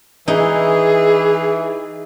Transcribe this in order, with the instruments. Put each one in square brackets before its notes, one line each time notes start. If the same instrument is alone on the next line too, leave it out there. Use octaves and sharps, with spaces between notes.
[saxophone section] E3 [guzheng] D#4 [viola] G#4